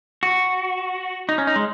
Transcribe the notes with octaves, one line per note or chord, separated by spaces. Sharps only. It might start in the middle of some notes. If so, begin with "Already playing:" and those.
F#4
D#4
C#4
D#4
G#3